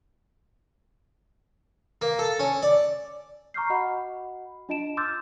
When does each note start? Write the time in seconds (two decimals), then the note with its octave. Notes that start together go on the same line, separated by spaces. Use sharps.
2.02 A#3
2.19 A4
2.40 C#4
2.63 D5
3.54 A#5 C#6 D6 F6 G6 C7
3.70 F#4 D#5 F#5 B5
4.69 D4 F4 D#5 A5 D7 E7
4.97 C6 D6 E6 F6 G6 A6